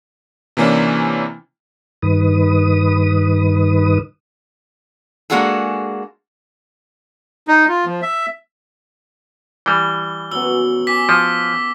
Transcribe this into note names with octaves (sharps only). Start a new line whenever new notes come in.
C3 E3 A#3 C#4 D4 E4
G2 D#3 B4 D#6
G#3 A#3 D4 F#4 G#4 A4
D#4
F4
F3
E5
E3 G3 G7
F#2 B3 E6 G7
G4 G#5 D6 B6
F3